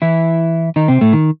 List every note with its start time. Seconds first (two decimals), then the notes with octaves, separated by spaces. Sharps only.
0.02 E3 E4
0.76 D#3 D#4
0.88 C3 C4
1.01 A2 A3
1.13 D#3